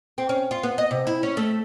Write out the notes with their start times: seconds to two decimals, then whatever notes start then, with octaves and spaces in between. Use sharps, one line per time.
0.18 C4
0.29 C#4
0.51 F4
0.63 B3
0.78 D#5
0.91 C3
1.07 E4
1.23 C#4
1.37 A3